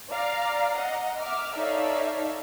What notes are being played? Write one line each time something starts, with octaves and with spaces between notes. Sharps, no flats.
D5 F5 A#5
D#5 F#5 A#5
E5 D6 F6
D#4 A4 C#5 D5 E5 F5